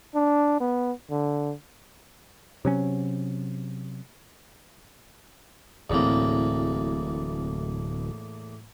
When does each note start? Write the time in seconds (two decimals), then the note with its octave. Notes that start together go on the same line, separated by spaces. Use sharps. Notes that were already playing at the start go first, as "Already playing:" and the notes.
0.15 D4
0.60 B3
1.11 D3
2.65 C3 F#3 C#4
5.90 D1 E2 A2 A#3 C4